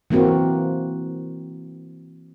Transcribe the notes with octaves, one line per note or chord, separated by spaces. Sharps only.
E3 A#3 C4 F#4